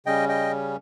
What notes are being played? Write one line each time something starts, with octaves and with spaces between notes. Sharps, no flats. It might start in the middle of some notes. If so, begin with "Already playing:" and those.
C#3 G3 C#4 D#5 G5
D#5 G5